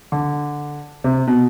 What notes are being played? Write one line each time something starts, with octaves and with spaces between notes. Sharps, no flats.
D3
C3
B2